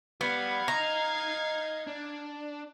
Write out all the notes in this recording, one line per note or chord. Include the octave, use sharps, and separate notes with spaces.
G3 B3 F5 G#6
D#4 D#5 A#5
D4